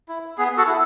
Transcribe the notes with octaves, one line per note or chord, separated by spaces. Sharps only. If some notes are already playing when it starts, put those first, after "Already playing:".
E4
B3 G#4
F#4 A4
E4